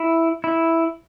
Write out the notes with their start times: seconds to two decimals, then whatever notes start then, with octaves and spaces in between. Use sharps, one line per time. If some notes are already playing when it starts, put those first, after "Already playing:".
Already playing: E4
0.44 E4